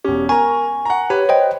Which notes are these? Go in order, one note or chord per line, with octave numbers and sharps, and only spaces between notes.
E1 C#4 G4
A#4 G#5 A#5 C#6
F#5 A#5
G4 B4 C#5
C5 D#5 G5